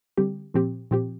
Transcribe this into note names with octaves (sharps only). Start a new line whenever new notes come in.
D3 G3 C4 G4
A#2 F3 C4 G4
A#2 F3 C4 G4